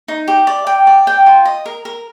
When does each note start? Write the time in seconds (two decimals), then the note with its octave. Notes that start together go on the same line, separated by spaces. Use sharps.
0.08 D#4
0.28 G4
0.47 D5
0.67 G5
0.87 D5
1.07 G5
1.26 F4
1.45 D#5
1.66 A#4
1.85 A#4